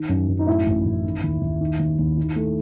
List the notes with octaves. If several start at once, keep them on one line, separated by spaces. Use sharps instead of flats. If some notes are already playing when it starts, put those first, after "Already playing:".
Already playing: D#3
F#2
F#2
D#4
A2 E4
A1
A1
D#3
D#2
D#2
D#3
D#2
D#2
D#3
A3